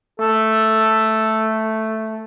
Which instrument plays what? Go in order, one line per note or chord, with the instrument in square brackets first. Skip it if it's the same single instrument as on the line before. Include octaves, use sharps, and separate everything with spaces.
[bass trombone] A3 [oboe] A4